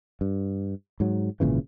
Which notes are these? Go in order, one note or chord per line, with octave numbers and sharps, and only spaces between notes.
G2
G#2 F#3
G#1 A#2 C#3 E3